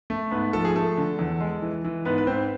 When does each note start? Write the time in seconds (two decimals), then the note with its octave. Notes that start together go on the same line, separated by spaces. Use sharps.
0.10 A3
0.31 G#2 B3 B4
0.53 F3 A4
0.65 G#4
0.75 A3 A4
0.97 D3
1.19 E2
1.41 G#3
1.62 E3
1.84 E3
2.05 G#2 B3 B4
2.18 B4
2.27 G#2 C4 C5